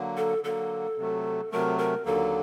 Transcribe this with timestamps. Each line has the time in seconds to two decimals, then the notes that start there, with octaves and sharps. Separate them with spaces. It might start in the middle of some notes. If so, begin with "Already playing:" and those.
Already playing: D3 F#3 A#3
0.17 A4
0.44 D3 F#3 A#3 A4
0.98 C3 F#3 A3
1.52 C3 F#3 A3 A#4
1.78 A#4
2.05 D#2 D3 F#3 A#3 A4